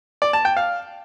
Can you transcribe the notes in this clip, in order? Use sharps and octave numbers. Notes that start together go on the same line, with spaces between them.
D5
A5
G5
F5